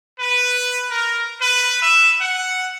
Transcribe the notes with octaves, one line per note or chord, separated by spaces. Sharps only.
B4
A#4
B4
E5
F#5